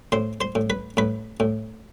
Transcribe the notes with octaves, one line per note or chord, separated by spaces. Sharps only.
A2 C5 C6
C5 C6
A2
B4 B5
A2 B4 B5
A2